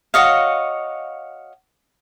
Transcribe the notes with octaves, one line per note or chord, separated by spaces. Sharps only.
F#4 C#5 D#5 F5